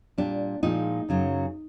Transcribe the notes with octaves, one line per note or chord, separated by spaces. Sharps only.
A#2 G3 D4
A#2 F3 G#3 D#4
F#2 C#3 F#3